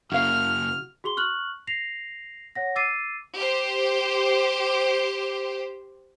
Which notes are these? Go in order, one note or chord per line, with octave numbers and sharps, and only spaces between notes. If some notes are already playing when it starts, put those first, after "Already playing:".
F#2 C#3 A#3 E4 F#4 F5 F6
F#4 G#4 C6 G7
C#6 F6 F#6 F#7
A#6 C7 F7
C#5 F#5 A#6
D6 E6 A6 C7 D#7
G4 C5